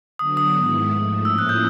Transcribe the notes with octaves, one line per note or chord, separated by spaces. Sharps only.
D3 F#3 B3 D4 F#4 D#6
D#6
G#2 D#3 G#3 B3 E4
G#2 F3 A3
A2 F3 A#3 C#4 E4 E6
F#6
G6